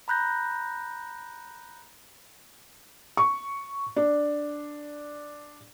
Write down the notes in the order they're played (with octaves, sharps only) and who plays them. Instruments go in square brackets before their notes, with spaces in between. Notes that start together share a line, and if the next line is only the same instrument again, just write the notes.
[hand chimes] A#5 B5 F#6 G6 A#6
[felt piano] C#6
D4